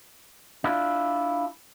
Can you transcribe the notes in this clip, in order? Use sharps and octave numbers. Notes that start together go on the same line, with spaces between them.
D4 E4 F4